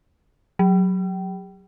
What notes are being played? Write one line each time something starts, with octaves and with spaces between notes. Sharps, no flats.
F#3